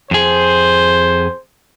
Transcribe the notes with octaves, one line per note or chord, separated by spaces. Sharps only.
F2 G#4 C5